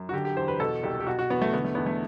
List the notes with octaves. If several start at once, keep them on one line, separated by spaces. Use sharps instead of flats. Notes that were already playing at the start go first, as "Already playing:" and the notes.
Already playing: F#2
F#4
D3 G4
G4
E2 C5
B4
B2 A4
C2 G4
G4
B2 F#4
F#4
E2 B3
A3
D3 B3
A3
E2 B3
A3